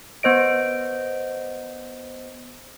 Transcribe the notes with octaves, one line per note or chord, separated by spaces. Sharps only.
B3 C5 D#5 D7